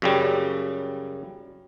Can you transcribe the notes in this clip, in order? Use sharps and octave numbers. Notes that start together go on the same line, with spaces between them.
F#2 C#3 G3